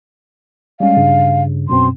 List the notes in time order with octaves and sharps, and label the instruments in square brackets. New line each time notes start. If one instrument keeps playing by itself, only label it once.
[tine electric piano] G3 G#3 C#4 [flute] F5
[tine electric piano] G2 C#3
[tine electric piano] F#2 B2 C4 [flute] C6